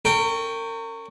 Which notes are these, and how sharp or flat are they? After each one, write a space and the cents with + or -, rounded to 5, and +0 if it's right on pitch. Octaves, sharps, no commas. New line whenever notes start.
C#4 +0 A#4 -35 G5 +0